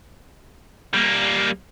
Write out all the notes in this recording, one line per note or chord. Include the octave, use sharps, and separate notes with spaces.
G3 A#3